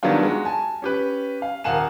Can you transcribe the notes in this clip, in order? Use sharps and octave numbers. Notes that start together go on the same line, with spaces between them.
D#3 F#3 G3 B3 D4 F4
G#3 F#4
G#5 A5
C#4 G4 B4
F5
D#1 A#4 F5 F#5 G#5 E7